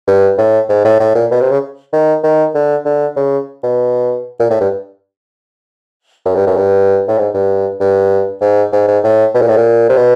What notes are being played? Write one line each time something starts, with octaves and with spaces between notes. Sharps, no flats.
G2
A2
G#2
A2
A2
A#2
B2
C3
C#3
D#3
D#3
D3
D3
C#3
B2
A#2
A2
G2
F#2
G2
F#2
G2
A2
G#2
G2
G2
G#2
G#2
G#2
A2
B2
A#2
A2
A#2
C3
B2